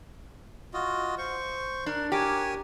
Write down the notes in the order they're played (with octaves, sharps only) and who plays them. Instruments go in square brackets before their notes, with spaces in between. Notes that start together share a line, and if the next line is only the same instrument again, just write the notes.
[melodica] F4 F#4 D#5
C5 C#6
[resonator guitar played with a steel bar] D4 [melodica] A#4
[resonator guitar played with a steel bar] G4 [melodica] A#4 C#5 G#5